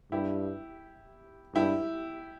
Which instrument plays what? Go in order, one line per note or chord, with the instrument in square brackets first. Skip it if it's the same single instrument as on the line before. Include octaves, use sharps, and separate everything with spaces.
[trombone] G2 [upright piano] E4 G4
[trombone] G2 [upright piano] E4 G4